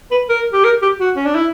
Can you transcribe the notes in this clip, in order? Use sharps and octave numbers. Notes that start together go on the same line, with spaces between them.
B4
A#4
G4
A#4
G4
F#4
C#4
D4
E4